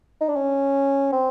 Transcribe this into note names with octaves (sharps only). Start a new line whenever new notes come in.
D#4
D4
C#4
C4